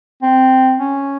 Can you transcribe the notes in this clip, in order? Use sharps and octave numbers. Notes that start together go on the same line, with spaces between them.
C4
C#4